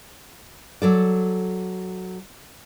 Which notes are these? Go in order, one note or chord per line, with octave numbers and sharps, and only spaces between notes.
F#3 A4 D5